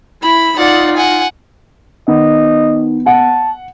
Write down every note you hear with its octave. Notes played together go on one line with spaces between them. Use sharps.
E4 B5
D#4 F4 D5 F#5
F#5 G#5
D#3 B3 D#5
F#5 A5